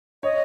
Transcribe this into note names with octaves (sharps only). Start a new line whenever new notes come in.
C#5 D#5